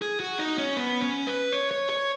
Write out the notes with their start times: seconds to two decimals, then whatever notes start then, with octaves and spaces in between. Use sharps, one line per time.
0.02 G#4
0.20 F#4
0.39 D#4
0.58 C#4
0.77 B3
1.02 C#4
1.27 B4
1.52 C#5
1.71 C#5
1.90 C#5